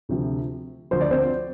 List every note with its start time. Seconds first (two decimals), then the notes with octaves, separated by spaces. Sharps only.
0.09 D2 C3 F3
0.91 D2 D3 F3 C5
1.01 D5
1.11 C4 C5